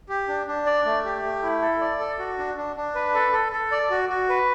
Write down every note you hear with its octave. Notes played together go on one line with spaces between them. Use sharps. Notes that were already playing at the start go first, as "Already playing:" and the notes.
G4
D4
D4
D5
A3
G4
A3
E4
A4
D5
A4
F#4
D4
D4
D4
B4
A4
A4
A4
D5
F#4
F#4
B4